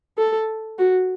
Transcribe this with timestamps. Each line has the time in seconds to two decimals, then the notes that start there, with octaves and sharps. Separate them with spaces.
0.18 A4
0.79 F#4